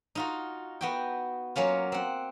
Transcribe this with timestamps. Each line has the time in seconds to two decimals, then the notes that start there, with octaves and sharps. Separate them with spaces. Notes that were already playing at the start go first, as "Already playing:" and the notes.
0.15 D#4 F4 F#4
0.81 B3 F#4 G5
1.56 F#3 A#3 C#4 F4
1.92 C4 F#5